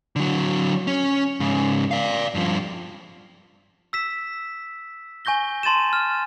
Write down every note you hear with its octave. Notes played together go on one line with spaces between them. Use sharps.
D3 F#3
C#4
G#2 C#3
D5 F5
G2 F3
E6 B6 E7
G#5 C#6 G6 A#6 G7
A5 C6 A6 D#7 E7
F6